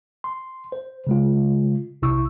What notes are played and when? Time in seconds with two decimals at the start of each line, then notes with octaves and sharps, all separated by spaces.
0.24 C6
0.72 C5
1.07 C#3 G#3 F4
2.02 B1 C3 E4 C#6 E6